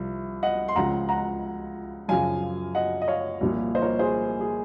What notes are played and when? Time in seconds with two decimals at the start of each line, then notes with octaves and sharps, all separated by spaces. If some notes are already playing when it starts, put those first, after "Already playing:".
Already playing: C2 C3 F3
0.43 D#5 F#5
0.68 C6
0.76 C#2 C#3 F3 F#5 A#5
1.09 F#5 A#5
2.08 F#2 C#3 F3 F5 G#5
2.75 D#5 F#5
3.02 D#5
3.08 C#5 F5
3.41 C2 A#2 F3
3.75 C5 D#5
3.82 A#4 C#5
3.99 G#4 C5
4.41 G#4